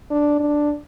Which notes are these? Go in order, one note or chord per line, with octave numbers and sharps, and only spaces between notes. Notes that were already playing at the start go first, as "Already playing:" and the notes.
D4
D4